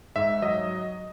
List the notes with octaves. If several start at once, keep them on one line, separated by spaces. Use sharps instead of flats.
G#2 E5
F#3 D#5